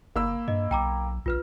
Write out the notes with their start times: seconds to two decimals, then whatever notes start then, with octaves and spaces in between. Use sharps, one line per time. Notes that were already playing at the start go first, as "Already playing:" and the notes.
0.16 F#1 A#3 B5 E6
0.48 G2 D#5
0.71 B1 G5 A#5 D6
1.26 A#1 F4 B4 F6